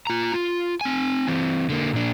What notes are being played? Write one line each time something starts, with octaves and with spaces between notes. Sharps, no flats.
F4 A#5
F4
C4 G#5
E3 C4
D3 A#3
A#2 D4